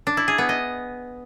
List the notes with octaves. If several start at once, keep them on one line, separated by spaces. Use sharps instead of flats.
D4
E4
G#4
B3
D#5